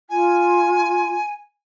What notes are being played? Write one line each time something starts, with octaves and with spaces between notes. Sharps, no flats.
F4 G#5